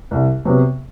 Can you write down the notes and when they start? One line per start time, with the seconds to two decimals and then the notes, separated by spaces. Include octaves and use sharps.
0.11 C2
0.45 C3 F#3 B3